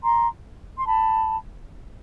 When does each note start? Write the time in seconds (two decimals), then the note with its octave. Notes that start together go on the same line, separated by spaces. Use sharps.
0.02 A#5 C6
0.78 C6
0.86 A5 B5